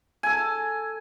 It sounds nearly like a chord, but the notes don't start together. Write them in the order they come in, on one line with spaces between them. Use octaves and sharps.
G#5 A4 A5